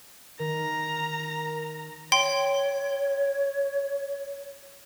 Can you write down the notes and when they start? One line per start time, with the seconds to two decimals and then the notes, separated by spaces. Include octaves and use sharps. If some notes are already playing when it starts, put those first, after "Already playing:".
0.39 D#3 A#4 A#5
2.12 C#5 G5 C6